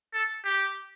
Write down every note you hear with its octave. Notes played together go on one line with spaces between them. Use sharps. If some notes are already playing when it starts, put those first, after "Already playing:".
A4
G4